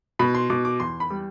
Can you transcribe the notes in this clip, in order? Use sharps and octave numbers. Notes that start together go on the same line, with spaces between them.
B2 B5
C6
B2 D6
D6
E2 C6
B5
G3